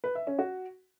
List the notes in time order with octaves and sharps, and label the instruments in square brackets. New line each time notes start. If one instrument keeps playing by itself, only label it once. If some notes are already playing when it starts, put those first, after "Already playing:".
[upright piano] B4
E5
C#4
F#4